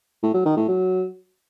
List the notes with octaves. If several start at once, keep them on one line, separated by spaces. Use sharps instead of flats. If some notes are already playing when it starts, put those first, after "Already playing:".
A2
F#3
D#3
A2
F#3